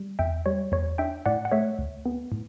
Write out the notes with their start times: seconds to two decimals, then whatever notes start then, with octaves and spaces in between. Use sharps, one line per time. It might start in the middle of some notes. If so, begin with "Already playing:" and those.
Already playing: G3
0.19 E2 E5 G5
0.46 G3 C#5
0.72 E2 C#5
0.98 D4 E5 G5
1.26 A2 D5 F#5
1.45 F#5
1.52 A3 C#5 E5
1.79 D2
2.05 B3
2.32 A2